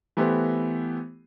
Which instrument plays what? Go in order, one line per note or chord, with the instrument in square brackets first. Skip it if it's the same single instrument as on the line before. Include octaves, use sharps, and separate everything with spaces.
[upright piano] E3 A3 B3 G4 C5